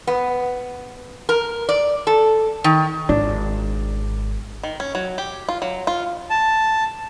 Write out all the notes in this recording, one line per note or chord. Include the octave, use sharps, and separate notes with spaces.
B3
A#4
D5
A4
D#3
G#1 D4
D#3
C#4
F#3
G4
F4
F#3
F4
A5